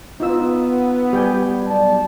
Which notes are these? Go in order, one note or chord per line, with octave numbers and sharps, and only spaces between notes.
B3 D#4 F4 E6
G3 G4 G5 G#5
B1 D5 A5